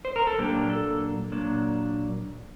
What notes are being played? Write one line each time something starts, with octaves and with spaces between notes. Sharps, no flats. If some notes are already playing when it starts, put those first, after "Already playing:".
C5
A#4
A4
A#2 F#3 A#3 D4 G4
A4
A#2 F#3 A#3 D4